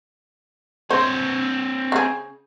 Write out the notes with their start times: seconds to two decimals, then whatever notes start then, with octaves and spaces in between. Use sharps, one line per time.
0.90 C4 C5 C#5
1.92 C#3 G#4